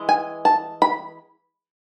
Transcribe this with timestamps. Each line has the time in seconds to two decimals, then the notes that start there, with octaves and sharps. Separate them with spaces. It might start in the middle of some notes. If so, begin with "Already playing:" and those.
Already playing: E3 G#3
0.09 G#5
0.45 A5
0.82 B5